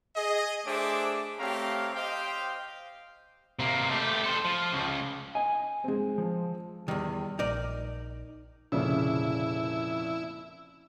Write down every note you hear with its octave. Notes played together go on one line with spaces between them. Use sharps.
G#4 D#5
A3 D4 G#4 C5 E5 D6
A3 C4 G4 C#5 F5 A#5
G4 C5 D#5 F5 G5
C3 A#3
A3 G4
A4 C5
F3
C#2
D#5 G#5
G#3 C4
F3
E2 D#3 G3
A#1 D#4 A#4 D5
F1 A#2 C#3 E4